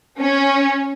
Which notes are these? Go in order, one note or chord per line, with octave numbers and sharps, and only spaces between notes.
C#4